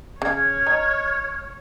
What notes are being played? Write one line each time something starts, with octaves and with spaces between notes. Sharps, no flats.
C#3 C#5 F6 G#6
D#4